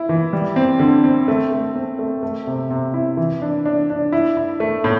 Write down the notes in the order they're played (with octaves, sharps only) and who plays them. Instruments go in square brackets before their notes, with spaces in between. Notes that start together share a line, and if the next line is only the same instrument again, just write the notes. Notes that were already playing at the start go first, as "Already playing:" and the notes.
Already playing: [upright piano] E4
E3
G3
C4
D3
C4
A3
A3
C4
A3
A3
C3
C3
E4
E3
D4
D4
D4
E4
E4
A3
A2